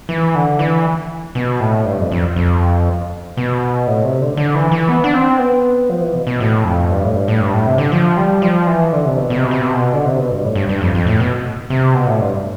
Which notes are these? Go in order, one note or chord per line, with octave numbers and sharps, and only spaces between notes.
E3
D3
E3
B2
A2
G2
F2
F2
F2
B2
A2
C3
D3
D3
E3
E3
B3
D4
C4
B3
F3
E3
B2
B2
A2
F2
G2
A2
G2
A2
G2
A2
C3
D3
F3
G3
F3
E3
D3
C3
B2
B2
C3
B2
C3
B2
C3
B2
D3
C3
B2
G2
A2
G2
G2
F2
F2
A2
B2
C3
B2
A2
G2